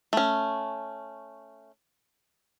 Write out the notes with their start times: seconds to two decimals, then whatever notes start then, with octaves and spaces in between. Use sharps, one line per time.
0.13 A3 C#4